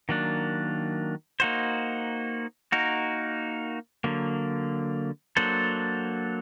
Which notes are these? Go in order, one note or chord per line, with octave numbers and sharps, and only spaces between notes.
D#3 F#3 A#3 D4
A#3 D#4 F#4 C5
A#3 D#4 F#4 A#4
D3 F#3 A#3
F#3 A#3 D4 A4 C5